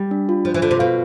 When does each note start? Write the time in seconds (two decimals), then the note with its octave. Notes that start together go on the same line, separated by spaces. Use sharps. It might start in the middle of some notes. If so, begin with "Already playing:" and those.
Already playing: G3
0.11 D4
0.29 F4
0.45 F3 C5
0.54 E3
0.62 D3 F4
0.71 C3
0.79 B2 F5